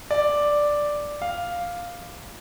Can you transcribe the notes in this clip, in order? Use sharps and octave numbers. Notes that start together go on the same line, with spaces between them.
D5
F5